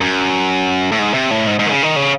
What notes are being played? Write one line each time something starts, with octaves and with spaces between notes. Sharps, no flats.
F#2
A2
G#2
C3
A2
G#2
G#2
D#3
C#3
D#3
C#3